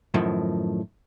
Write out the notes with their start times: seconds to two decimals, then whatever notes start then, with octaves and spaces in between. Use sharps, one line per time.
0.14 F#2 A2 D#3 F3